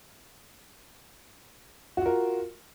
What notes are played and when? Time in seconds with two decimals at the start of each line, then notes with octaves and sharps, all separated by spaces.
1.97 F#4
2.01 F4
2.06 A#4